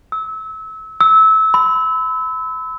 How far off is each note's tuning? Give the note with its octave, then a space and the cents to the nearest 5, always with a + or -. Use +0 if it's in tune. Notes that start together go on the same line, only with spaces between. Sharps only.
E6 -30
E6 -25
B5 +40